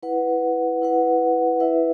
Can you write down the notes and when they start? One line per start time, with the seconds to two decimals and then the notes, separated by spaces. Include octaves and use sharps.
0.03 E4 B4 F#5
0.82 E4 B4 F#5
1.60 E4 B4 E5